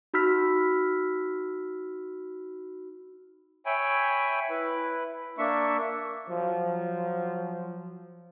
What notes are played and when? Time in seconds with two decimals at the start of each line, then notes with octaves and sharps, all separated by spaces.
0.14 D#4 F#4 B5 E6 F6 B6
3.66 C#5 E5 G5 G#5 B5
4.50 E4 B4
5.38 A#3 D4 E5 C#6
6.29 F3 F#3